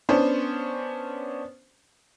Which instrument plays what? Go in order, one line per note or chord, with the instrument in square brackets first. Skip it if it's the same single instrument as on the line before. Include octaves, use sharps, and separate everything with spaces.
[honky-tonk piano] B3 C#4 D4 C5